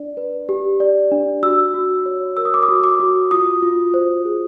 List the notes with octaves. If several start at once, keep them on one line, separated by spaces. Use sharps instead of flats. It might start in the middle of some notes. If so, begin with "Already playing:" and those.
Already playing: D4 D5
B4
G4
D5
D4
F#4 E6
F#4
C#5
A#4 E6
D#6
D6
D#6
F#4
D6
F#4
F4 D#6
F4
C5
G#4